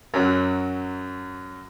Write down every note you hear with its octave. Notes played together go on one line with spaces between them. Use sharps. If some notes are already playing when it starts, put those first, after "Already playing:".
F#2 F#3